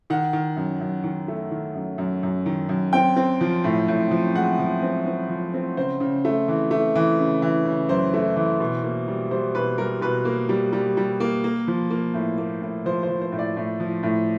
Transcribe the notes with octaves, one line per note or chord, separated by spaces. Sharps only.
D#3 F#5
D#3
F#2
F#2
D#3
A3
D#3
F#2
F#2
F#2
D#3
F#2
C4 G5
C4
F3
A2
A2
F3
G#3 F#5
F3
C4
C4
F3
C4
C#3 C5
C#3
A3
E3
A3
E3
C#3
E3
C#3
F#2 C5
A3
E3
B2
A#3
G3
G3 C5
B2 B4
G3 A#4
B2 B4
A#3
G3
G3
G3
A#3
A#3
F3
A#3
A2
A#3
A2
F3 C5
C5
F3
C5
A2
D5
A2
F3
A2